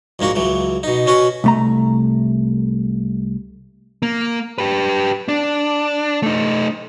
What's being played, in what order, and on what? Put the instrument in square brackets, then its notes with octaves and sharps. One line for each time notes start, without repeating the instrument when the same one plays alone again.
[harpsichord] A#1 G#2 A#3 F#4
C#2 E3 F#3
B2 D#4
B2 C#4 F#4 B4
[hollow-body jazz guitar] C2 A3 A#5
[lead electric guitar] A#3
G4 B4
D4
A3 D#4